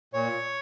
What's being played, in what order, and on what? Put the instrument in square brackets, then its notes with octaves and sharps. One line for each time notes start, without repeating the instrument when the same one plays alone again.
[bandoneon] A#2 C#5